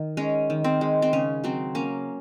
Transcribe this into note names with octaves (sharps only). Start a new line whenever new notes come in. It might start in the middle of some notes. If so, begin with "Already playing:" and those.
Already playing: D#3
G#3 C#4
D#3
C4
G#3
C4
C#3 C#4
F#3 C4
A#3 C#4